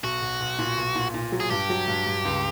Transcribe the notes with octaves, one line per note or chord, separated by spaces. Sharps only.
B1 F#4
B1
B1
A#2
B1
A#2
A#2
F#3
G#4
G2 G4
F#3
G2
G2
C#2